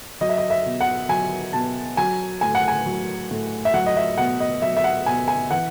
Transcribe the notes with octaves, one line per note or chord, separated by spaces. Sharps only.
F#3 D#5
E5
D#5
E5
B2
F#5
F#3 G#5
B2 A5
F#3 G#5
A2 G#5
F#5
G#5
F#3
A2
E5
F#3 F#5
D#5
E5
B2 F#5
D#5
F#3 E5
E5
F#5
B2 G#5
G#5
E3 F#5